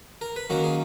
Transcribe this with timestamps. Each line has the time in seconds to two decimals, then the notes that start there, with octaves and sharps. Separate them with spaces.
0.21 A#4
0.36 B4
0.50 D#3 F#3 A#3 C#4 A#4
0.64 G#4